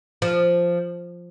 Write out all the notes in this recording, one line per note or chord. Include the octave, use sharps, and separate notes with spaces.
F3